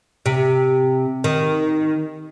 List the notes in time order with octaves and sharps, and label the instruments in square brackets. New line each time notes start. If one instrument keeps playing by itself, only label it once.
[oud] C3
D#3